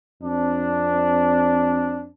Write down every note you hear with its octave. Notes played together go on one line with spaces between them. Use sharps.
F2 C4 D4